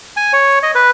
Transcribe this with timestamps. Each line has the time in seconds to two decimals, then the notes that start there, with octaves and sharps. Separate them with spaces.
0.17 G#5
0.33 C#5
0.63 D#5
0.75 B4